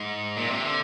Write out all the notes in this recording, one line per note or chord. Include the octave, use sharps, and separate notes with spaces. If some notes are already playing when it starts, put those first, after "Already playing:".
Already playing: G#2
A#2
C3
D3